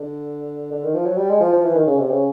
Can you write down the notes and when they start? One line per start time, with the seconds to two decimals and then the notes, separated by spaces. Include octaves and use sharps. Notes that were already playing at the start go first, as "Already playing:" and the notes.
Already playing: D3
0.72 D3
0.83 D#3
0.94 F3
1.06 F#3
1.17 G3
1.29 G#3
1.40 F3
1.52 F3
1.64 E3
1.75 D#3
1.87 C#3
1.99 C3
2.10 C#3